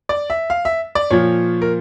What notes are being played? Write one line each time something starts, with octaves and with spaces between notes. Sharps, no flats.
D5
E5
F5
E5
D5
A#2 F3 C#5
A#4